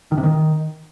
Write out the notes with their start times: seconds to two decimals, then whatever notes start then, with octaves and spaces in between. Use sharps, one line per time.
0.12 D#3
0.18 C3
0.23 D#3